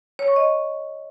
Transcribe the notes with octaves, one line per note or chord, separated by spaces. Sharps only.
C#5
C#6
D#5